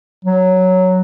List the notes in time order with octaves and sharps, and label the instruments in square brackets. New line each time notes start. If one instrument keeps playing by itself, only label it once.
[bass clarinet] F#3